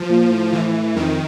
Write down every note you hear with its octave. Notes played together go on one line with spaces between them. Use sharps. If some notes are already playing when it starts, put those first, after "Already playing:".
Already playing: F3
A#2
A2
E3
F2 D#3